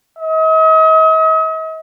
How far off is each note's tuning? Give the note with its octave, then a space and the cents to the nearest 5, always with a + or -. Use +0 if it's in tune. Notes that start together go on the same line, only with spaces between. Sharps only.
D#5 +40